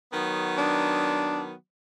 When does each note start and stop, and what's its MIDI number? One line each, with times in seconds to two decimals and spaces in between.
0.13 1.54 51
0.13 1.54 54
0.13 1.54 59
0.58 1.42 62